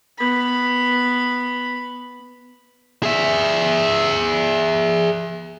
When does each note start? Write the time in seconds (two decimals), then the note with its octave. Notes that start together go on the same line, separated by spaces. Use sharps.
0.18 B3 B5
3.03 G#4 E5